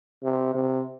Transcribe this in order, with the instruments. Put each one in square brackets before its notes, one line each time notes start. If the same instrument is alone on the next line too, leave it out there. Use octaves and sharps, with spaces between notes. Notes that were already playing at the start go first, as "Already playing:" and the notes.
[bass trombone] C3
C3